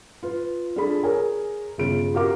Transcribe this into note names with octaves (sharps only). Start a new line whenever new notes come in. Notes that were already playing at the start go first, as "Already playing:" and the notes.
F4 B4
D4 F4 G#4 A4 B5
G#4 A#4 C#5 G#5
G1 C#3 F4 D7
F#4 G4 A#4 F5 D6